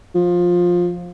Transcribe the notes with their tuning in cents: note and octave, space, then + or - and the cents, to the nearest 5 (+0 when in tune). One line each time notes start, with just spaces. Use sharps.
F3 +15